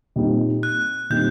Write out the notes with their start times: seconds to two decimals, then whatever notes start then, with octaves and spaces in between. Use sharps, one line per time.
0.16 A#2 G3 C4 D#4
0.63 F#6
1.10 A#2 G3 C4 D#4 G6